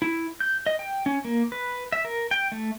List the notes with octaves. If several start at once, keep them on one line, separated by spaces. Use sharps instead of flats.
E4
G6
D#5
G5
C#4
A#3
B4
E5
A#4
G5
A3